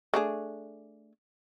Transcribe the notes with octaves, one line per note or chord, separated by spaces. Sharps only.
A3 D4 G#4